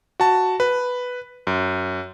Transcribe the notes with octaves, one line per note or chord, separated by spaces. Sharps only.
F#4 A5
B4
F#2